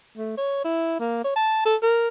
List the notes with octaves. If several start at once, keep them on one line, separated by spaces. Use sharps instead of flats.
A3
C#5
E4
A#3
C#5
A5
A4
A#4